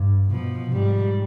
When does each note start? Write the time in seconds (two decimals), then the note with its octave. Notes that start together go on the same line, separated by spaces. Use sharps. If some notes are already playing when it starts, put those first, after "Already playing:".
Already playing: G2
0.30 B2 F3
0.73 G#2 G3